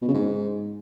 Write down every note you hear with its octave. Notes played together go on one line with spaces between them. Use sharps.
B2
C#3
G#2